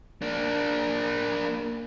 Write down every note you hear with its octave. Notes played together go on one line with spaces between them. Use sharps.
A#3 D4